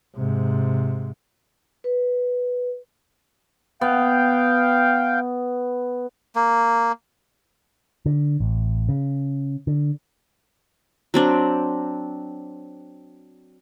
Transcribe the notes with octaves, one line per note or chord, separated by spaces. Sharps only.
G#2 C3
B4
B3 F5 G5
A#3
D3
A1
C#3
D3
F#3 C4 D4